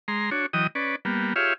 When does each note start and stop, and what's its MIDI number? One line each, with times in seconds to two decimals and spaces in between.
0.08 0.30 56
0.08 0.30 82
0.08 0.30 84
0.31 0.46 62
0.31 0.46 66
0.31 0.46 73
0.53 0.67 52
0.53 0.67 54
0.53 0.67 75
0.53 0.67 79
0.53 0.67 87
0.75 0.96 61
0.75 0.96 71
0.75 0.96 74
1.05 1.34 55
1.05 1.34 58
1.05 1.34 59
1.36 1.53 65
1.36 1.53 67
1.36 1.53 68
1.36 1.53 73
1.36 1.53 76
1.36 1.53 77